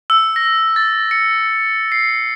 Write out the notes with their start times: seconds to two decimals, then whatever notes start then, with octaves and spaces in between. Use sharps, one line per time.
0.10 E6
0.36 A#6
0.76 A6
1.11 C#7
1.92 C7